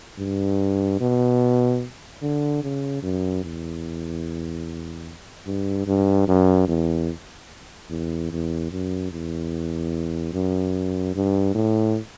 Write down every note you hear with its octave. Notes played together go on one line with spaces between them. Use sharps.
G2
B2
D3
C#3
F#2
E2
G2
G2
F#2
E2
E2
E2
F#2
E2
F#2
G2
A2